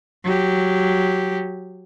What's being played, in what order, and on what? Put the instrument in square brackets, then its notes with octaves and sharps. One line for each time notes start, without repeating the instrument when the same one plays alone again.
[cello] F#3 G4